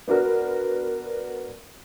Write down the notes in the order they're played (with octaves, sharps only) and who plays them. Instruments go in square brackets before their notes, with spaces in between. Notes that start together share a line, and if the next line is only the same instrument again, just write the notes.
[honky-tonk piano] B3 D4 F#4 A#4